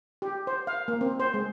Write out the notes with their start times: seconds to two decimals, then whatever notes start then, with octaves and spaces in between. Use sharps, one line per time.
0.22 G4
0.47 C5
0.67 F5
0.88 A#3
1.01 C4
1.20 C5
1.34 G#3